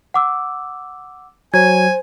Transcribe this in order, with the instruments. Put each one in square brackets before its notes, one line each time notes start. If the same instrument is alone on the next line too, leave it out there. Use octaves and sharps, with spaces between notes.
[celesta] F#5 D6 E6
[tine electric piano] F#3 [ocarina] C5 [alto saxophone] G#5 [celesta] G#6